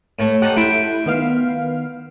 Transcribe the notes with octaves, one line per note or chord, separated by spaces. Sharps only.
A2 A3
D#4 G4 A4 F#5
A3 E4 E5 G5 C6
D#3 B3 F5